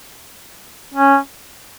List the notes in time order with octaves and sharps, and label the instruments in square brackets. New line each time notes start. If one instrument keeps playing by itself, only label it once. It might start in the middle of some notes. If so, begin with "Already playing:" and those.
[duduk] C#4